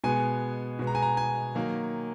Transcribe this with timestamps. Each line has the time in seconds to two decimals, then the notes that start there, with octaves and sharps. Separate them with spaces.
0.04 B2 G#3 B3 G#5
0.79 B2 G#3 B3
0.87 A#5
0.95 G#5
1.02 A#5
1.17 G#5
1.55 D#3 F#3 A#3